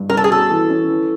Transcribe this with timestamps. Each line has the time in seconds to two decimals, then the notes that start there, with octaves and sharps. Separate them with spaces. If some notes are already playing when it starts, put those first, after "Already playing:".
Already playing: G2
0.10 C#4 A#4
0.17 A4
0.24 G#4
0.29 B2 A4
0.50 E3
0.70 C#4
0.89 E3